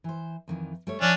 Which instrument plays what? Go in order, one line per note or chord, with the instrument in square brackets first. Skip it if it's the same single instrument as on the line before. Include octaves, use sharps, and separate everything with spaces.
[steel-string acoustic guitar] E3 C5
F2 D#3 E3
G3 A3 C#5
[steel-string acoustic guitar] F3 [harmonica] C#4 D4